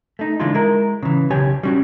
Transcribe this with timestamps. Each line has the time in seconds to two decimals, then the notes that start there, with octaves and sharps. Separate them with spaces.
0.19 A3 D#4
0.40 D3 E3 G#3 E4 F4
0.54 G#3 E4 A#4
1.02 C#3 E3
1.30 B1 C#3 G4 C#5 G#5
1.63 G3 C#4 F#4